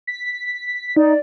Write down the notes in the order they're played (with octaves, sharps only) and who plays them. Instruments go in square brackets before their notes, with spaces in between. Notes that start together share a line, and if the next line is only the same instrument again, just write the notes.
[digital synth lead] B6
[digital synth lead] D#4 [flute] D5